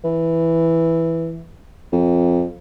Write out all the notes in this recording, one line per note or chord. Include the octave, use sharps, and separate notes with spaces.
E3
F2